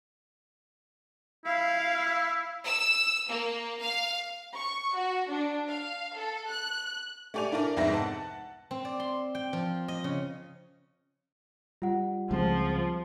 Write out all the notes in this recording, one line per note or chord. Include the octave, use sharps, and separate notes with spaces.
E4 F5
E6
A#3
F5
C#6
F#4
D4
F5
A4
F#6
A3 G4 D5 G#5 F7
D4 E4 A4 A#4 D5
C2 F2 G#2 B3 E5 A#6
F#5 A5
C4
D5
C6
G5
F3
D#5
C#3
G3 F4 F#5
C#2 F3 G#3 C4